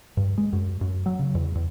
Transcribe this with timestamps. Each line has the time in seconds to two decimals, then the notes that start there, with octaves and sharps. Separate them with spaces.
0.17 G2
0.38 G#3
0.53 F#2
0.81 F#2
1.06 F#3
1.19 C#3
1.35 E2
1.55 E2